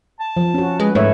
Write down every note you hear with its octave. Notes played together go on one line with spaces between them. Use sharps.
A5
F3
C#4 F#4
G#3 B4
G#2 A3 B4 C#5 E5